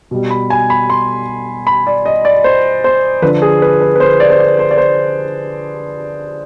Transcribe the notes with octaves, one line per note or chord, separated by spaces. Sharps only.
B2 G3
B5
G#5
B5
C6
B5
D5
D#5
D5
C5
C5
D3 F3 B4
G#4
B4
B4
B4
C5
D5
C5
D5
C5
D5
C5